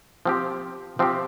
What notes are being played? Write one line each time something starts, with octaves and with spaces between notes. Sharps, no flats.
F3 C4 G4
F3 C4 G4